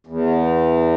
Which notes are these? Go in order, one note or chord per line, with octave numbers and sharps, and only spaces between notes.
E2